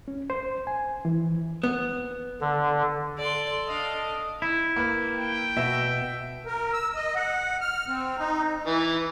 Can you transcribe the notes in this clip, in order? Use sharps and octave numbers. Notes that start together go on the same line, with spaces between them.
C#4
C5
G#5
E3
B3
D3
A4 D5 C6
D4 D#5 F5
E4
A#3 B4
G5
B2 E5
A#4
E6
D#5
F#5
F6
C4
D#4
E3